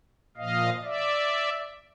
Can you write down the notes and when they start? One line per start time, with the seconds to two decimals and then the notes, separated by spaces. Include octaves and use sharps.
0.37 A#2 F3 D#5 F5
0.84 D5 E5